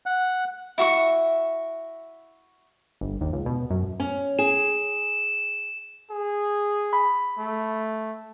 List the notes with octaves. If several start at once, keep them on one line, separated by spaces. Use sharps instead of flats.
F#5
E4 F#4 E5 C#6
G1
D#2
C#2
B2
F#2
C#4
G#4 E7
G#4
B5
A3